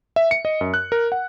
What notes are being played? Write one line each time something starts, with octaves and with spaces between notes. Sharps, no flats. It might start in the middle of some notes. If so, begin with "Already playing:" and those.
E5
C#7
D#5
F#2
F#6
A#4
F#5